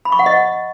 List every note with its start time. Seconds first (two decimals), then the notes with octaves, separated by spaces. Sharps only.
0.05 B5
0.12 C#6
0.19 F#5
0.26 D#5